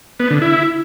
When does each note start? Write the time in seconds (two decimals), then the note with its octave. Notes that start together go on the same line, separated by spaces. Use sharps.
0.20 B3
0.31 D3
0.42 E4